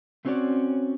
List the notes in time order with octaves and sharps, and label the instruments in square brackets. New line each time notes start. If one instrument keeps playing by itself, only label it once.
[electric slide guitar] A3 C4 C#4 F#4 C#5 D5